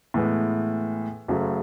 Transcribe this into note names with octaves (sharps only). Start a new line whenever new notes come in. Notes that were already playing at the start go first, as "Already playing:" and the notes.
A2 E3 G#3 B3
F#1 F#2 C#3 F#3 A3